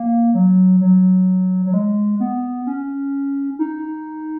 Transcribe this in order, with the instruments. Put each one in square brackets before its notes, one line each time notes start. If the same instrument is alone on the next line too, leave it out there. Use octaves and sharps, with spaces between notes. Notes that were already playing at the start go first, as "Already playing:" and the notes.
Already playing: [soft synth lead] A#3
F#3
F#3
F#3
G#3
B3
C#4
D#4